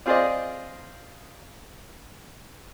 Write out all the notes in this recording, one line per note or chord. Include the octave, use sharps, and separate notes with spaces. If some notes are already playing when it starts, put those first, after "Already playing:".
C4 F4 G#4 C5 D5 D#5